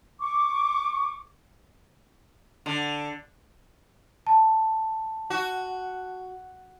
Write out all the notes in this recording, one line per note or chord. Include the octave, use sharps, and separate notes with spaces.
C#6 D6
D3
A5
F#4